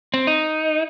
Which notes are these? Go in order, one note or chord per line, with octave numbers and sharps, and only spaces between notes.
C4
D#4